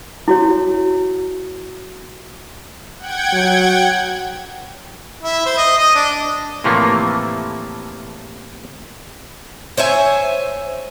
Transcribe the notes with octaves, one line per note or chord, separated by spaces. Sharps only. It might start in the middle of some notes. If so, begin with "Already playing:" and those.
E4 F#4 C#5
F#5 G5 G#6
F#3
E4
C5
D#5
D#5
D4
A2 C3 E3 F3 A3 A#3
C5 C#5 E5 G#5